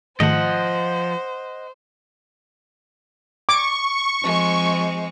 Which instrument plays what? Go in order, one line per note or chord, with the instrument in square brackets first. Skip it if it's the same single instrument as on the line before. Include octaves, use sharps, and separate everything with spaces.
[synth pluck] G#2 D#3 A3 [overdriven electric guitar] F3 [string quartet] C5 [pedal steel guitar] D#5 F#5
[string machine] C#6 [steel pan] D6
[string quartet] F3 G#3 C4